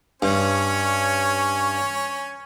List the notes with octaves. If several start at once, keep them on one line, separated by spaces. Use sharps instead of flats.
G2 C#4 C#5